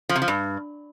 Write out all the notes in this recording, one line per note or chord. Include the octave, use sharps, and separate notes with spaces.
F3
C3
F3
G2